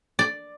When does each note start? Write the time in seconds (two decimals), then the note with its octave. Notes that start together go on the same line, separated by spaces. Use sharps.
0.19 D5